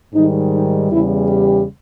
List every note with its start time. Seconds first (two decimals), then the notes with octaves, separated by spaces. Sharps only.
0.14 G#2 D#3 G3 D#4
0.53 D#4
0.91 E2 C#3 G3 E4
1.29 G4